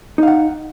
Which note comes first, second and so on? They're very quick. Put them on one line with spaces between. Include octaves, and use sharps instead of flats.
D#4 F5 F#5